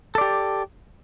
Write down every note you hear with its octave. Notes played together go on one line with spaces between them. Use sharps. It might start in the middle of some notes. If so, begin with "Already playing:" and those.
G4 A4 D5